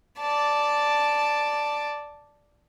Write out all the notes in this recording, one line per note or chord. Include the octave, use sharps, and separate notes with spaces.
D5 A5